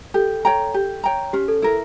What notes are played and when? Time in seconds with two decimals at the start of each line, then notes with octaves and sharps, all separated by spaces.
0.14 G4 A4
0.45 C#5 G5 A#5
0.74 G4
1.04 C#5 G5 A#5
1.33 C#4 G4
1.48 A4
1.62 E4 A4 A#4